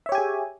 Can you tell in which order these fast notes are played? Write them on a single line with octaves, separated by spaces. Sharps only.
E5 C#5 G4 G#5 G#4